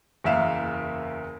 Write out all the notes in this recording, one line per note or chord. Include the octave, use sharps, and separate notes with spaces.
F#1 E2 A#3 E5 F5 E7